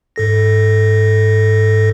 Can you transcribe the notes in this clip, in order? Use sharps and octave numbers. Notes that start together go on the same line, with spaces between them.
G#2 A4 A#6